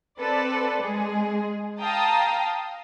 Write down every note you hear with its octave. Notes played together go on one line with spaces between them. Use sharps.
C4 A4 B4 D5
G#3 G#4
F5 G5 A5 A#5 D#6